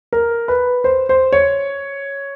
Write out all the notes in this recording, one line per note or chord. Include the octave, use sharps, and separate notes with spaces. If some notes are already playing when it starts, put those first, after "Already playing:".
A#4
B4
C5
C5
C#5